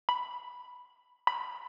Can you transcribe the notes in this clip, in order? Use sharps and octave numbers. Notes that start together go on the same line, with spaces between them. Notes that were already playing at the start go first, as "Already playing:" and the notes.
B5
B5